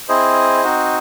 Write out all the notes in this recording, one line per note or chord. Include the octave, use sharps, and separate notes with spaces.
C4 E4 G#4 C5 D#5
C4 D#4 F#4